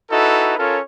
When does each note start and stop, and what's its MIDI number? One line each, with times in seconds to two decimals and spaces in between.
0.11 0.57 63
0.11 0.57 64
0.11 0.57 66
0.11 0.57 69
0.11 0.57 71
0.58 0.79 61
0.58 0.79 65
0.58 0.79 69
0.58 0.79 70
0.58 0.79 73